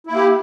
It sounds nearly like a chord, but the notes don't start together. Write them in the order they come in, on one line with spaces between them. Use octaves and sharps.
E4 A#3 G4